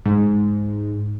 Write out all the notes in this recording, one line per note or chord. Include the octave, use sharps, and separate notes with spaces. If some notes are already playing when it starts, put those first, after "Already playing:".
G#2